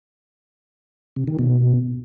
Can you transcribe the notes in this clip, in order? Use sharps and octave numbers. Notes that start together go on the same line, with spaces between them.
C3
D#3
B2